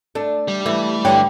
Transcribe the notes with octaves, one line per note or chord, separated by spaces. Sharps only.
A3 D4
G3
E3 A3
G2 D3 C#5 G5